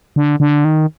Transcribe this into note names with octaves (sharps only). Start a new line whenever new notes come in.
D3
D3
D#3